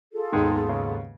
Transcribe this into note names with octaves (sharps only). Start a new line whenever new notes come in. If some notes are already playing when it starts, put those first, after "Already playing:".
F4 G#4 A4
D#2 G#2 D#3 G#3 B3 D#4
C#3